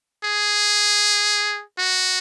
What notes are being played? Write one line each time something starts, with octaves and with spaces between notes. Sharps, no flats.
G#4
F#4